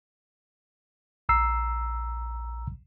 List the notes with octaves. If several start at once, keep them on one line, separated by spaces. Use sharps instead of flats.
A#1 A#5 E6 C7